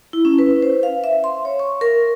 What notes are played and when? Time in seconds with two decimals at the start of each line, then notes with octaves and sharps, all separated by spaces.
0.13 E4
0.25 C#4
0.38 B4
0.62 C5
0.83 F5
1.04 E5
1.24 C6
1.45 C#5
1.59 C#6
1.81 A#4